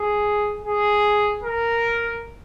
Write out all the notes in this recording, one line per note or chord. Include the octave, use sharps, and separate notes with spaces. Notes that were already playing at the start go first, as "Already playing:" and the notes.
Already playing: G#4
G#4
A#4